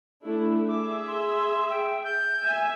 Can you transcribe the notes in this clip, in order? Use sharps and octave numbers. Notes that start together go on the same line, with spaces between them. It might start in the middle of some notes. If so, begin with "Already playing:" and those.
A3 D4 E4
G#4 E5 D6
C6
G5
G6
E5 G#5